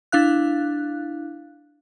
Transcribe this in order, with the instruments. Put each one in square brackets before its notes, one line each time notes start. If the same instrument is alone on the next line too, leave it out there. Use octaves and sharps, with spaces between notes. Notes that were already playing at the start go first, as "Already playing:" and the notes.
[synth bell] D4 E4 F5 F#6